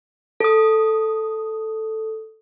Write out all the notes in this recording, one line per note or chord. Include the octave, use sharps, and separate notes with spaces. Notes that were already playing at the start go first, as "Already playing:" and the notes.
A4 D#6